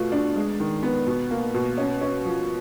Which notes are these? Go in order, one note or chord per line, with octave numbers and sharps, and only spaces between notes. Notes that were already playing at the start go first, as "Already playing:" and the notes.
Already playing: B2 A3 F4
D4
G#3
D#3
B3
B2
A#3
B2
C#4
C#4
F3